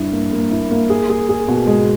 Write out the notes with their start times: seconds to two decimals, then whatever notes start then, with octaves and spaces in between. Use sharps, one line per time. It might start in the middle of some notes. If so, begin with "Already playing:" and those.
Already playing: G2 E4
0.12 A#3
0.32 A#3
0.51 E4
0.71 A#3
0.90 G#4
1.10 G#4
1.29 G#4
1.48 B2
1.67 G#3